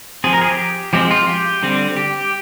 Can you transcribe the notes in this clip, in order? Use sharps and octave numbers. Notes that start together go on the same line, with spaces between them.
F3 C4 G#4
A#4
G#4
G4
F3 G#3 C4 G4
F4
G4
D3 G3 C4
G4